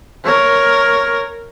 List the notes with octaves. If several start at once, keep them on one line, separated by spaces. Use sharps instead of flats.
A#4 C#5